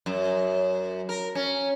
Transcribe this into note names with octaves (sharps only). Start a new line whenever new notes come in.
F#2
A#4
C#4